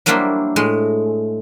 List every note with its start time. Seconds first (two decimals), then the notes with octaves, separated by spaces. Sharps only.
0.06 F#3 G3 A#3 D4 E4 C5
0.56 A2 G#3